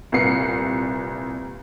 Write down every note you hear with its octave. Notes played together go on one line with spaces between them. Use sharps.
C2 A#2 B4 C7 C#7